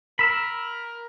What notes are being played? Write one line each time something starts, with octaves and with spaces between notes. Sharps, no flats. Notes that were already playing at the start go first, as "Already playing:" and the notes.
A#4 B5 E6